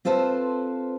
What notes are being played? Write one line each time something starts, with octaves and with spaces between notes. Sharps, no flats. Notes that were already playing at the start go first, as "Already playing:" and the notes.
C4 F4 A4 B4 C5